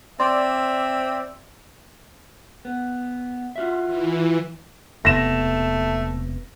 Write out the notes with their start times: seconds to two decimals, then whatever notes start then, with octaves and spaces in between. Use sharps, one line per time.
0.20 C4 D5 E5 C6
2.65 B3
3.56 F4 F#4 E5
3.86 E3
5.05 E1 C3 A3 B3 A#6 E7